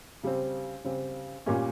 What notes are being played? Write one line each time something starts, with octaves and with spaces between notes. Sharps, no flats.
C#3 G3 C4
C#3 G3 C4
A#2 G3 A#3 C#4